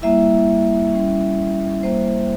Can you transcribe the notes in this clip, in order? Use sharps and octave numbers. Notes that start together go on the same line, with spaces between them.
G3 A#3 E4 E5
G3 C#4 E4
G3 A#3 E4 C5